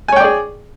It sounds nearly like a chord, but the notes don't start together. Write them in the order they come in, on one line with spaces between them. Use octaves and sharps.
G#5 C#5 G5 D5 G#4